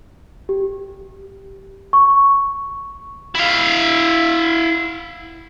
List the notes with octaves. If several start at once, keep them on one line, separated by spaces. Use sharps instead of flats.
G4
C#6
E4 F5